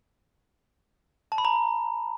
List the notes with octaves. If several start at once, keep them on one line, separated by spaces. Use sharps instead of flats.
A5
B5
A#5